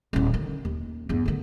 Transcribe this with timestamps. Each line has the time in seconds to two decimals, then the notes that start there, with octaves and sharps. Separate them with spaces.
0.13 D#1 E3
0.34 D3 D#3
0.65 D#2
1.09 E2 G2
1.26 D3 D#3